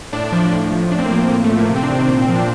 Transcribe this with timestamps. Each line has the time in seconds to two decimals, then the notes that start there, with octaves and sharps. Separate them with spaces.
0.13 A2 D4
0.32 F3
0.52 A2
0.71 F3
0.91 A2 D4
0.99 C4
1.06 A#3
1.11 F3 C4
1.31 A2 A#3
1.44 A3
1.50 F3
1.57 A#3
1.70 C3
1.76 C4
1.83 D4
1.90 D#3
1.96 C4
2.09 A#2 C4
2.22 C4
2.29 F3
2.35 D4